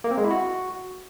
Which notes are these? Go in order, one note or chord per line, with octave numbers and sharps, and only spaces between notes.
A#3
C4
G#3
E4
F#4